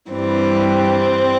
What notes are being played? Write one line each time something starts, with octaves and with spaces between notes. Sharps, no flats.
G2 E3 G3 C4